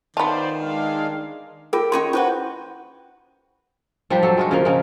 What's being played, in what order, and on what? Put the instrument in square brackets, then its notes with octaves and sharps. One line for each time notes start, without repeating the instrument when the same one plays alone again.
[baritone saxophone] D#3 [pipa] B3 F4 [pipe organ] C5 D5 [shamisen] A5 B5
[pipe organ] G#3 D4 F5
[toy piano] F4 G#4 A#4 [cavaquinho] G4
[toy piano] C#4 F4 C6 [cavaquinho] C#5 D#5 C#6
[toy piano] E4 C5 C#6 [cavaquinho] F#4 B4 G5
[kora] F3 G3 D4 G4
F#3 A4
G#3 F4 F#4
C#3 F3 A#3
C#3 G#3 A#3